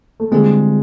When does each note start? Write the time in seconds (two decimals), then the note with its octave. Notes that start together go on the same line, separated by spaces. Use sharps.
0.20 A3
0.31 D3 G3 G#3 C4 F4